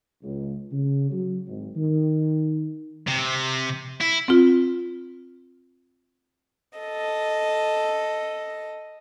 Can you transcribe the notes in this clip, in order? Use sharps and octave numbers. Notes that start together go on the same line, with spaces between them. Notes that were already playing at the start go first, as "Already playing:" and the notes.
C#2
C#3
F#3
G#1
D#3
C3
E4
C4 F4
A4 D#5